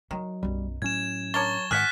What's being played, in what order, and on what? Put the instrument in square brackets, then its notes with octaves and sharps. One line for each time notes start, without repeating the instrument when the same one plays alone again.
[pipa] D#3 [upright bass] F#3
[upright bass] B1 F#2 [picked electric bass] G3
[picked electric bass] A2 C#4 [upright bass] F#3 [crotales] G#6 E7
[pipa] D4 A#4 C#5 [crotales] C#6 A6 G7
[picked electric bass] G#2 D#3 [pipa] G#4 F#5 [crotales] F6 F#6 B6